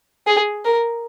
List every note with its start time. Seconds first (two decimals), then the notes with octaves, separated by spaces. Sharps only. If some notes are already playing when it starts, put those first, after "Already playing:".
0.27 G#4
0.65 A#4